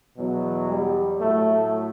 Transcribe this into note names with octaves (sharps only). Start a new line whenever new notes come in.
E2 B2 F#3
G3
A2 F#3 A3